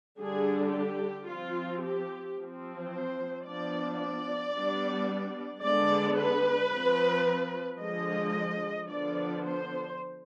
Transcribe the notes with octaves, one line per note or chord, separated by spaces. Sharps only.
D3 G3 D4 G#4
G4
F3 C4 F4
G4
F3 C4
C5
F3 B3 D4 D5
D5
G3 B3 D4
D3 G#3 B3 D4 D5
B4
F3 C4
D3 F3 G#3 D#5
D3 F3 B3 D4 D5
C5